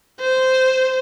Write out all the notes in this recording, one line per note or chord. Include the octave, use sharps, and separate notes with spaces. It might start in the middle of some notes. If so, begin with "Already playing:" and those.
C5